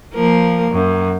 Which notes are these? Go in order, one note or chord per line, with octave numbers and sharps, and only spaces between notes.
F3 A#3 A#4
F#2